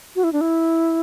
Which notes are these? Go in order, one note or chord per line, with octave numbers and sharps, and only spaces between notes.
F#4
E4
D4
E4